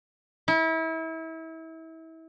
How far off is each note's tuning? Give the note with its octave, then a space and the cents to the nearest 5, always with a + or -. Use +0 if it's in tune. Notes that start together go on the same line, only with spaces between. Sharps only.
E4 -30